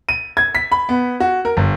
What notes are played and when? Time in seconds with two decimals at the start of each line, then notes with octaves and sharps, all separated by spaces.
0.09 D#7
0.37 G#6
0.55 B6
0.72 B5
0.89 B3
1.20 F#4
1.45 A#4
1.57 G1